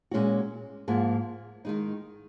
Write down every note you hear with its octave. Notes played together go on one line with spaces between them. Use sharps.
A#2 G#3 C#4 F#4
G#2 F3 A#3 F4 G#4
D#3 G#3 D#4